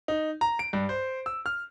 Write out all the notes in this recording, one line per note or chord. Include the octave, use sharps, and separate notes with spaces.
D#4
A#5
D7
G2
C5
E6
F6